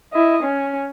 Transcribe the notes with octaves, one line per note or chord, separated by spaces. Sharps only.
E4 D#5
C#4